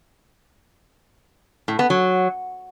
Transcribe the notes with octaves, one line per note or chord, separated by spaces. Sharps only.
A2
B3
F#3